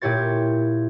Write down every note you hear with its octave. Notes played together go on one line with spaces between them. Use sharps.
A#2 E4 G4 C#5 A6